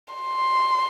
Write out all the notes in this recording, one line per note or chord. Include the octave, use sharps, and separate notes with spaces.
C6